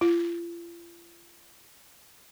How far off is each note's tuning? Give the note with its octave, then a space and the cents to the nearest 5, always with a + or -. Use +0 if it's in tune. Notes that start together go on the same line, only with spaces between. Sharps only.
F4 -40